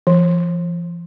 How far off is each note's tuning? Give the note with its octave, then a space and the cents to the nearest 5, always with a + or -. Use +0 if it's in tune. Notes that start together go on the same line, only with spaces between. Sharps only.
F3 -40